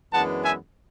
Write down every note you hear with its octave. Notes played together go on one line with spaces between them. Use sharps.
F#2 E3 G#3 B3 D4 F#5 A5
E5 G#5